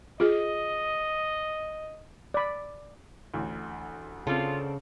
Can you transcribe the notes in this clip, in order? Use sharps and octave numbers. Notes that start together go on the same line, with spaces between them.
F4 G#4 D#5
D5 B5
A1 D2
C#3 C4 D4 F4 A4